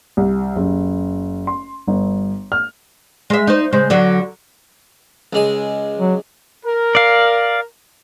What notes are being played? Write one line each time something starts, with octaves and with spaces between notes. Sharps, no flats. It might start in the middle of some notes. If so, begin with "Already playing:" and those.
C2
F#1
C6
G1
F6
G#3 E5
D#4 C5
C#3 G#3 C4
D3 F#3 F#4
C#2 G#3 G#5
F#3
A#4
D5 F5